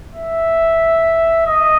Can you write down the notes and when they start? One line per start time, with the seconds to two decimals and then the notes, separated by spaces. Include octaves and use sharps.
0.13 E5
1.47 D#5